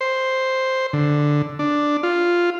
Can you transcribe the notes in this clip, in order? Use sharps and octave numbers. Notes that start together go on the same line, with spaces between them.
C5
D3
D4
F4